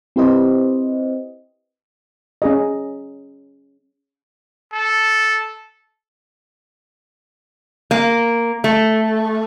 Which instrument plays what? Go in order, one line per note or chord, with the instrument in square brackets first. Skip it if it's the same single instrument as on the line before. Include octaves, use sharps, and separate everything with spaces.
[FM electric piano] C4 E4 G4 B4 C5 D#5
[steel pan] C#4 G#4 D#5
[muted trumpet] A4
[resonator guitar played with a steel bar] A#3
A3